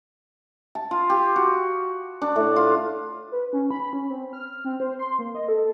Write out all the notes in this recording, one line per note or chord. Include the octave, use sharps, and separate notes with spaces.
A5
F4
G4
F#4
D4
A2
F4
B4
C#4
B5
C#4
C4
F6
C4
C5
C6
A#3
D#5
A4